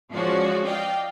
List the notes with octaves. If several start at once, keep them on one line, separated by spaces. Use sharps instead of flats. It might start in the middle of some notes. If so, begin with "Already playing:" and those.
F3 G#3 C#4 F#4 D5
D5 D#5 F5 G5